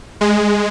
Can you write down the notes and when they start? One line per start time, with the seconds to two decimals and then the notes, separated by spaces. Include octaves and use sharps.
0.21 G#3